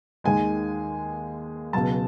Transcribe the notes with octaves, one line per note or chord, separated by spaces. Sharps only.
D#2 D#3 G#3 G#5
C#2 B2 F#3 A5